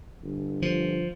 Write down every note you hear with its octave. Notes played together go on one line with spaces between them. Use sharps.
G1
F3